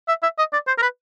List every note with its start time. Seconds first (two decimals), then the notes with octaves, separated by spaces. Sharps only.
0.08 E5
0.23 E5
0.38 D#5
0.53 D5
0.67 C5
0.78 A#4
0.82 B4